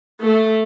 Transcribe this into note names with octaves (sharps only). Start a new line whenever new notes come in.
A3